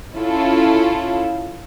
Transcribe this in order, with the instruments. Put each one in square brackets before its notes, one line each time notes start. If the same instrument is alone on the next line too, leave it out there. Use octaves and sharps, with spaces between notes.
[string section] C#4 E4 F4 A4